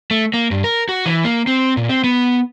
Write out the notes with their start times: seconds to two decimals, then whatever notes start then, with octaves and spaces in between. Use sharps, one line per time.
0.11 A3
0.34 A#3
0.51 G2
0.64 A#4
0.89 F#4
1.06 E3
1.25 A#3
1.47 C4
1.77 A#2
1.89 C4
2.04 B3